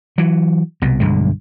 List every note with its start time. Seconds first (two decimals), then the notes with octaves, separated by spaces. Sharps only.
0.18 E3 F#3
0.82 C2 B2
1.00 B1 G2 D3 G#3